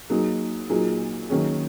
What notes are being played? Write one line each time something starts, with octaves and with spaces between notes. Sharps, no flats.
F#3 A#3 D#4 G#4
A#2 F#3 A#3 D#4 G#4
D#3 F#3 A#3 C#4 G#4